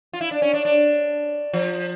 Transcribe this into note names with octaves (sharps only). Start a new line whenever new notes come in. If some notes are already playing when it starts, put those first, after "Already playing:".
F4
E4
D4
C#4
D4
D4
F3